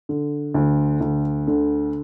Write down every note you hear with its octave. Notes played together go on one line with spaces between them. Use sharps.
D3
D2
D2
D3